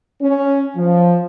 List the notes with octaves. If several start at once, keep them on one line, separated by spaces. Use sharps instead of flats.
C#4
F3